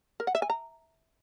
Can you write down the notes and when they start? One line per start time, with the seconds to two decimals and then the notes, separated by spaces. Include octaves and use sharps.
0.20 A#4
0.27 F#5
0.35 E5
0.42 G#5
0.50 A#5